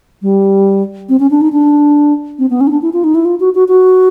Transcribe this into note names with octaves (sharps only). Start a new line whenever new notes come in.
G3
C4
C#4
D4
D#4
D4
C4
B3
C#4
D#4
D4
E4
F4
D#4
E4
F4
F#4
F#4
F#4